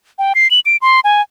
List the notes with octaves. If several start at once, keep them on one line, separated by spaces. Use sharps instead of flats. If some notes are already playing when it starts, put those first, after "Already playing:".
G5
C7
F#7
D7
C6
G#5